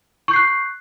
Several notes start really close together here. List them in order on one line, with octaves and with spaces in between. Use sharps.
C#6 G6 C7 F#6